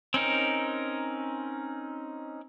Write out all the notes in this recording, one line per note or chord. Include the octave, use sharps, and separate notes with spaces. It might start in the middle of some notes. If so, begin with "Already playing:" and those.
C4 C#4 D#4 A#4